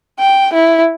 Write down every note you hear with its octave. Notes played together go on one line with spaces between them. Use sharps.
G5
E4